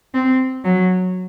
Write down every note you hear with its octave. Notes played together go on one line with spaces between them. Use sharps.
C4
F#3